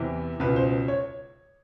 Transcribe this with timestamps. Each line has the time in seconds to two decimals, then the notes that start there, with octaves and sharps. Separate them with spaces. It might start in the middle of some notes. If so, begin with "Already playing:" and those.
Already playing: E2 C3 E3
0.40 C#2 B2 B4
0.56 C5
0.88 C#5